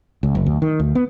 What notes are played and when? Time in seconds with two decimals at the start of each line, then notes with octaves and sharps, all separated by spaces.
0.23 C#2
0.35 F#1
0.46 D2
0.62 D#3
0.80 D2
0.95 B3